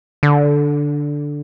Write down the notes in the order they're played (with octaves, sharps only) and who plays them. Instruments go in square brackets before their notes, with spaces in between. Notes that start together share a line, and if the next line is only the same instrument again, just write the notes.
[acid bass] D3